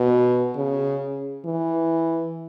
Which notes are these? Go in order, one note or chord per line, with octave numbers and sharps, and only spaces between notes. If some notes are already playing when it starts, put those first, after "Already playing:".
Already playing: B2
C#3
E3